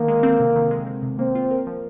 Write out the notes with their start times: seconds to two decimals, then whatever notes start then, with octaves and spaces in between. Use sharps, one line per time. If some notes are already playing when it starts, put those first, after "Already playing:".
Already playing: D3 D#3 A#3
0.08 G#3
0.23 C4
0.40 C3
0.56 D#3
0.71 G#3
0.87 C4
1.02 C3
1.19 A#3 C4
1.35 F4
1.51 A#4
1.67 F3